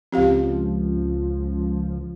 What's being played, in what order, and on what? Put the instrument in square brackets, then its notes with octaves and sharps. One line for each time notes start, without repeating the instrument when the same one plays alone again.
[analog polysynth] C#2 F3 [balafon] C4 G4 F5